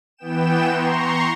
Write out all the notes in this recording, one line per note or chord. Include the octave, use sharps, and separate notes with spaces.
E3 B3 G5 E7
A#5 C6 C#6